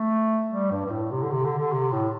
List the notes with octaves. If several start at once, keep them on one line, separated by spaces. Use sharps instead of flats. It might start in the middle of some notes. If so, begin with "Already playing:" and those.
Already playing: A3
G3
G2
G2
A2
C3
D3
C3
D3
D3
C3
A2